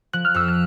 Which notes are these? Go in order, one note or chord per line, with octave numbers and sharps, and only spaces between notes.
F3 F#6
F6
F2 E6
F6